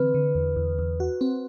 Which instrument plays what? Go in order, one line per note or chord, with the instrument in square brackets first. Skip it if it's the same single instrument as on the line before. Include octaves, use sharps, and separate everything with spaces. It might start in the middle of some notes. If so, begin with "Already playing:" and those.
Already playing: [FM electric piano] D3 E3 C4 [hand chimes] B4
[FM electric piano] D3
E2
E2
E2
F#4
C4